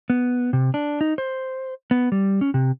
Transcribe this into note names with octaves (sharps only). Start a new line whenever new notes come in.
B3
C3
D4
D#4
C5
B3
G3
C#4
C3